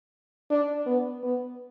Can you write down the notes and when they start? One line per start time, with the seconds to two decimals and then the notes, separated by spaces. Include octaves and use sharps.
0.50 D4
0.86 B3
1.23 B3